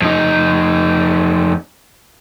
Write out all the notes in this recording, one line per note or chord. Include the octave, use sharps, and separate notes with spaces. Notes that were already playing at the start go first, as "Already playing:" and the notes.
F2 D#4